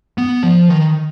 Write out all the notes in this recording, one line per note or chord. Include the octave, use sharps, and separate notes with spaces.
B3
F3
D#3